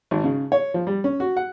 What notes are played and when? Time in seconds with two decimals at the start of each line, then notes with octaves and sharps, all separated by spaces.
0.11 G#1
0.24 C#3
0.52 C#5
0.74 F3
0.87 G3
1.04 C#4
1.20 F#4
1.37 F#5